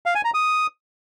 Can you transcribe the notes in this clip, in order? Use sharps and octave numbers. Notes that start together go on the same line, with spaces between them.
F5
G#5
A#5
D#6